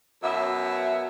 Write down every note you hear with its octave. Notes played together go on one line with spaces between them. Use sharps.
F#2 B2 B3 E5